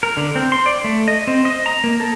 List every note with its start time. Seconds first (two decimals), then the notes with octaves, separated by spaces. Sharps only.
0.03 A#4
0.17 D3
0.36 C4
0.52 C6
0.66 D5
0.84 A3
1.08 D#5
1.27 C4
1.45 D#5
1.66 A#5
1.84 A#3
2.00 A4